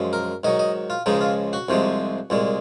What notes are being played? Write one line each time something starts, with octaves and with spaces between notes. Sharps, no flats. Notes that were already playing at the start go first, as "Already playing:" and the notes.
Already playing: F#2 F3 G#3
A#4
G#2 D#3 F#3 D#5
D#5
F4
C#2 C#3 F3 G#3 D#4
F4
F#4
C2 C3 F3 G#3
C2 A#2 G#3